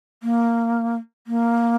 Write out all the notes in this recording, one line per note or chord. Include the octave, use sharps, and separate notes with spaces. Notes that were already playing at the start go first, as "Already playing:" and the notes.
A#3
A#3